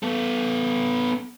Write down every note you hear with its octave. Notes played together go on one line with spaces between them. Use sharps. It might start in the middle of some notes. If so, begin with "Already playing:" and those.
B3 A4